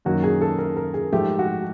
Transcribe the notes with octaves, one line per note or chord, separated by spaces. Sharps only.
F#2 D#3 F#3 A#3 F#4
G#4
A4
A#4
A#4
G#4
G#2 F3 A3 G4
F#4